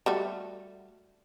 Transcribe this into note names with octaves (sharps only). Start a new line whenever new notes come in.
G3 A3 F#4